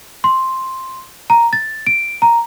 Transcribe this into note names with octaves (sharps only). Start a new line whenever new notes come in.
C6
A#5
A6
D7
A#5